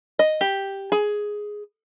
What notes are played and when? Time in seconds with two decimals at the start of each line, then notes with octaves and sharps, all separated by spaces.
0.19 D#5
0.41 G4
0.92 G#4